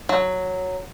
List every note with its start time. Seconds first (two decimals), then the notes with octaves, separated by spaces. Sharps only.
0.09 F#3